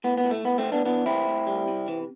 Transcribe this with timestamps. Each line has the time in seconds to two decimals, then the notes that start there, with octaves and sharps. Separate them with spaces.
0.04 A2 B3
0.18 B3
0.24 A2
0.31 A3
0.45 A2 B3
0.58 A3 C4
0.66 E3
0.72 B3 D4
0.85 E3 B3 D4
1.06 A2 C4 E4
1.27 A2
1.47 G3
1.68 C3
1.88 E3